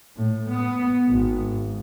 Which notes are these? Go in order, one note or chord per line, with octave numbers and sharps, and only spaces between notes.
A2
B3
G#1